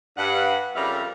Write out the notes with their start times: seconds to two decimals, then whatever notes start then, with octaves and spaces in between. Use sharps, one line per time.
0.17 G2 F#5
0.75 F2 C#3 G3 A#4 E5 F5